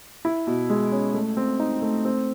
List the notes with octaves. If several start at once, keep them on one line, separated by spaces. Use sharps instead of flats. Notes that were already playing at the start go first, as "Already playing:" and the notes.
E4
B2
G#3
C#4
A3
C4
D#4
A3
C4